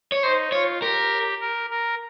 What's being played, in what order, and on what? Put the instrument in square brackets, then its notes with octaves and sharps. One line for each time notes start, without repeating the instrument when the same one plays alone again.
[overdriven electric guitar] C#5
[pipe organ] D#4 [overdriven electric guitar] C5
[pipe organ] F4 [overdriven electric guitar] C#5
[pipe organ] G4 [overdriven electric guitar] A#4
[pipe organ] A#4
A#4